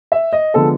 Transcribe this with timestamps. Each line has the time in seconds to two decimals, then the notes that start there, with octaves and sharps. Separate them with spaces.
0.12 E5
0.33 D#5
0.54 D3 F3 G#3 B3 A4